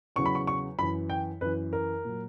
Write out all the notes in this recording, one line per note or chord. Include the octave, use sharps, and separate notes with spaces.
E2 C#3 F#3 C#6
B5
C#6
C#6
F#2 E3 B5
G5
F#2 E3 B4
A#4
A#2 F#3